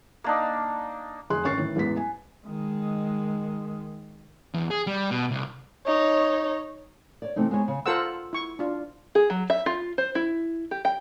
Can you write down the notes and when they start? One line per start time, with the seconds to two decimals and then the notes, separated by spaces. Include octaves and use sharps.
0.24 A#3 D4 D#4
1.30 F1 G#4 C6 F#6
1.44 G#1 D#3 C#4 C#6 A6 C7
1.58 A2 D#3 E3
1.76 A1 E2 G#3 B3 B6
1.97 G#5
2.46 D#3 G#3
4.54 E2
4.71 G#4
4.87 G3
5.11 B2
5.31 C2
5.86 D#4 C#5
7.22 C#5 D5
7.36 C3 E3 A3 C4 D#4
7.51 G#3 B3 C#5
7.68 C#3
7.86 F4 A4 A#4 C5 F#5 E6
8.33 E4 C#6
8.59 D4 F4
9.15 G#4
9.30 F#3
9.50 E5
9.66 F4
9.98 C5
10.15 E4
10.71 G4
10.85 G5